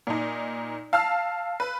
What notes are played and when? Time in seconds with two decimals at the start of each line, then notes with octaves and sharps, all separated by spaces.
0.07 A#2 D#4
0.93 F5 A5 E6 F6
1.60 B4